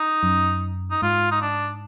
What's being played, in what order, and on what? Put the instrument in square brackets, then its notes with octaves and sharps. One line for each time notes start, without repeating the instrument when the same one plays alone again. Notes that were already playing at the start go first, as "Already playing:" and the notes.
Already playing: [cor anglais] D#4
[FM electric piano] F#2
[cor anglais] D#4
[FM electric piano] G#2 [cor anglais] F4
[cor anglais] D#4
D4